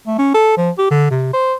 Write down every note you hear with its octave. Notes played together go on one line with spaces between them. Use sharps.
A3
C#4
A4
F3
G4
D3
C3
C5